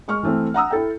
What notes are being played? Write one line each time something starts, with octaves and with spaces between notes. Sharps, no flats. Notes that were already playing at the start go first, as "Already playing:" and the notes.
G#3 C#6 F6
E3 A3 C4
F#5 A#5 D#6 E6
E4 A4 G5